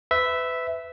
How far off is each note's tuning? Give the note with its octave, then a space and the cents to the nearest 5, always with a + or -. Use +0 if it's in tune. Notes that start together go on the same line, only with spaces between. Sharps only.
B4 +30 E5 -5